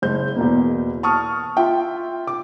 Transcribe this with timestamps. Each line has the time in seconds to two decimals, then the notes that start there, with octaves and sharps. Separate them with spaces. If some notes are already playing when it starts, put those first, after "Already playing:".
0.02 F#1 G#3 C5 G6
0.36 E2 B2 A#3
1.03 A5 C#6 D#6 F6
1.57 F4 E5 G5
2.27 D6